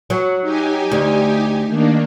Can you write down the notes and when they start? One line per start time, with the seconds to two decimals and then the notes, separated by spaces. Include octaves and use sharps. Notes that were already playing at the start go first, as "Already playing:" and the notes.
0.10 F#3
0.42 D#4 G4 G#5
0.92 D2
1.69 D#3 A#3 D4